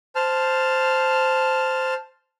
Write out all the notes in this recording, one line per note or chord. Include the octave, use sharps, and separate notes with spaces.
C5 A5 F6